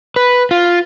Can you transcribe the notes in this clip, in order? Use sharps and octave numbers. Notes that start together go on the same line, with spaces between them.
B4
F4